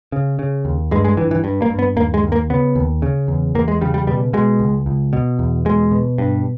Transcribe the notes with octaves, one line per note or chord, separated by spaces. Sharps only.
C#3
C#3
D#2
G2 G#3
G#3
G2 E3
E3
G2
A#3
G2
B3
D#2 A#3
G#3
D#2
A#3
C#3 B3
D#2
C#3
E2
E2 A#3
G#3
C#3 G3
G3
B2 G3
B2 G#3
C#2
C#2
B2
E2
B2 G#3
B2
G2